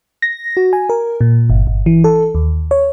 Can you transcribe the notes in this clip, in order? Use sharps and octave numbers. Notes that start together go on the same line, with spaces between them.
A#6
F#4
G#5
A#4
A#2
G1
G1
E3
A4
D#2
C#5